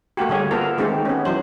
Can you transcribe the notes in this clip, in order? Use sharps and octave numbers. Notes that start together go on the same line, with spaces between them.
A3 A#3 F#4 G4
D3 G3 G#4 C#5
A#3 B3 F4 A4 A#4
D#3 G#3 A3 C4 D#4 G4
B3 C#4
E3 F#3 C5